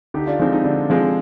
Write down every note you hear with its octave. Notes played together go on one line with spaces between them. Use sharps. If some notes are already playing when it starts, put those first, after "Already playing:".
D3 D#4 G4
D4 F4
F3 G#3 C4 D#4
D#4
D3 D4
F3 G#3 C4